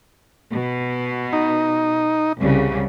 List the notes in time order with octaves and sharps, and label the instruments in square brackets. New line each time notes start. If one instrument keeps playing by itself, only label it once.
[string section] B2
[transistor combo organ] D#4
[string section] C2 C#3